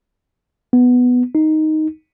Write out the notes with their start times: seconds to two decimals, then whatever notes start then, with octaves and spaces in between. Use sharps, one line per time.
0.73 B3
1.35 D#4